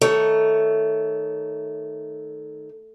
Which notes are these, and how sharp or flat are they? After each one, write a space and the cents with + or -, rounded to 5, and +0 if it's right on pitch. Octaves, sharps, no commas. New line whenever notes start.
D#3 +0 A3 +0 C#5 +20